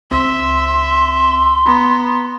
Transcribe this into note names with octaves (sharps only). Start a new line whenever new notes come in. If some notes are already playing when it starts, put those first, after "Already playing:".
C#2 C4 E5 C6
B3 A#5 B5